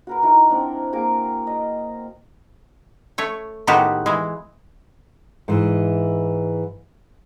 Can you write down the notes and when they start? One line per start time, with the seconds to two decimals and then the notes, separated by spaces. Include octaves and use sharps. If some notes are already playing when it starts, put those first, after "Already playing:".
0.07 F#4 A#4 B4
0.22 D#4 E4 F#4 A#4
0.50 C4 D4
0.93 A#3 A#4 G#5 D6
1.47 D#5
3.18 A3 C#5
3.67 A2 D#3 G#3 B3 F#4 G4
4.06 E3 G#3
5.48 G#2 E3